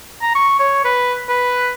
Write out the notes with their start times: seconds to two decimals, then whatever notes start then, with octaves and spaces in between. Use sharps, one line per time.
0.21 A#5
0.35 C#6
0.60 C#5
0.84 B4
1.29 B4